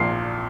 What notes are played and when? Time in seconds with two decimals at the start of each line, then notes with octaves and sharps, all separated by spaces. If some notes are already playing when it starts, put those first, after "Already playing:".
Already playing: A#1 A#2 C7